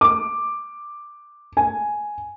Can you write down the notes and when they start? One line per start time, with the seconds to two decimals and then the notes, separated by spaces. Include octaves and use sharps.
0.01 D6
1.57 G#5